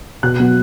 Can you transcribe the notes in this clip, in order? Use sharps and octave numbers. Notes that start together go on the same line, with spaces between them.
B2 F#6
F#3 B3